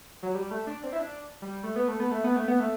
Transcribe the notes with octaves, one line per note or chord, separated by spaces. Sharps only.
F#3
G3
A3
D4
C4
E4
D4
G3
A3
B3
A3
B3
A3
B3
A3
B3
A3